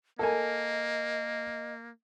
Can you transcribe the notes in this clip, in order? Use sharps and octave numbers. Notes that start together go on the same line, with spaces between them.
A#3 A4 A#4 D#5 G#5